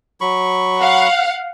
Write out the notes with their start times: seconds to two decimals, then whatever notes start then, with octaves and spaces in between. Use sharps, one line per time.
0.21 F#3 B5 C#6
0.80 F5 F#5